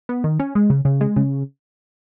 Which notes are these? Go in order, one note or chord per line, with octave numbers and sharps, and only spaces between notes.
B3
D#3
C#4
G#3
C#3
C#3
G#3
C#3